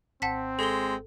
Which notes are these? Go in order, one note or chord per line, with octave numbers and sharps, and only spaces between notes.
G#1 C4 F#5 A5 B6
G#3 A4 G7